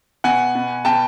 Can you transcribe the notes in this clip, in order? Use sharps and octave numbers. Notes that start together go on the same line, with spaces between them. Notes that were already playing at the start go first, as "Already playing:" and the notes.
B2 F#5 G#5
B2
B2 G5 A5